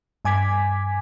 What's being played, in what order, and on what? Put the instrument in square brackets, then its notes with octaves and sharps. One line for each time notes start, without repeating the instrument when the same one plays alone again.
[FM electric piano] G2 G#5 D6 G#6 B6